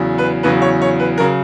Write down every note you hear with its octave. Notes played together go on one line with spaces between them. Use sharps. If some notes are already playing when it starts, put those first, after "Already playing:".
Already playing: E2 C#3 F#3
B4
E2 C#3 F#3 B4
C#5
C#5
B4
C#3 F#3 A#4